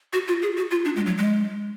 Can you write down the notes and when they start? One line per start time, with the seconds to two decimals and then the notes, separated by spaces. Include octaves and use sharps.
0.13 F#4
0.28 F4
0.42 G#4
0.57 F#4
0.71 F4
0.85 D4
0.96 G#3
1.06 F#3
1.18 G#3